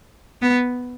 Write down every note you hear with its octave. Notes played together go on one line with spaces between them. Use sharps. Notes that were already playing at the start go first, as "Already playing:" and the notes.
B3